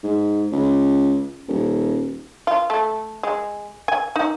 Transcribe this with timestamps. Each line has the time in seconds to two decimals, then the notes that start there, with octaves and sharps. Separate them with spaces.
0.03 G#2
0.52 C#2
1.48 D#1
2.47 F4
2.70 A3
3.23 G#3
3.88 G#5
4.16 D#4